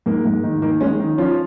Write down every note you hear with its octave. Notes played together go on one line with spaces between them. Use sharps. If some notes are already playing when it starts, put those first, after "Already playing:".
G#2 A#3
G#2
D#3
D#3 A#3
D#3 G#3 C#4
D#3
F3 C#4 F4